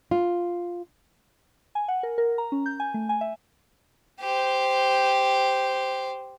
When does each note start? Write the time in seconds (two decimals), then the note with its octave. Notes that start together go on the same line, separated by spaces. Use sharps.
0.11 F4
1.75 G#5
1.88 F#5
2.03 A#4
2.18 A#4
2.38 A#5
2.52 C#4
2.66 G6
2.80 G#5
2.94 A3
3.09 G#5
3.21 E5
4.20 G4 C5